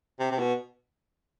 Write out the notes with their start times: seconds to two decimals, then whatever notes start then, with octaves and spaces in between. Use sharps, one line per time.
0.19 C3
0.31 C3
0.39 B2